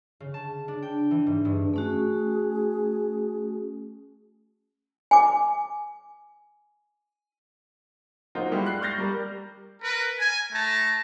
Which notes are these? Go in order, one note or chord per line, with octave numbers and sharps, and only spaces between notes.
C#3
A5
D4
G5
E3
G#2
G2
A3 C#4 F#4 G#4
G#5 D6
F#3 A#3 D#4 F4 F#4 C5
G3 G#3 E4 G4
F#6 C7
C#6 F6 G6 A6 A#6 C7
G3 A#4
A#4 B4
G#5
A3 A5 A#5